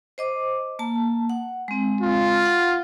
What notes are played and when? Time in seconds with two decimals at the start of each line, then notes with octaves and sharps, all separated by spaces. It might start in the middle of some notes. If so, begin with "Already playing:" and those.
0.18 C5 D#5 D6
0.79 A#3 A5
1.30 F#5
1.68 G#3 C4
2.01 F4
2.46 F#5